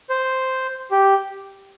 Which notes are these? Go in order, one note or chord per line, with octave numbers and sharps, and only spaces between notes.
C5
G4